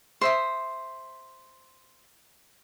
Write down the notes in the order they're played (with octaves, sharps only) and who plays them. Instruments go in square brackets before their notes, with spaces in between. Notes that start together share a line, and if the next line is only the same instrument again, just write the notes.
[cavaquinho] C5 E5 D#6